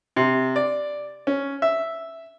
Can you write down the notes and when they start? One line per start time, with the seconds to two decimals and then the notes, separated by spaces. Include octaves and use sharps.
0.16 C3
0.56 D5
1.27 C#4
1.62 E5